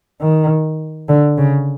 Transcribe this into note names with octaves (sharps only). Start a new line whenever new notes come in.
D#3
D3
C#3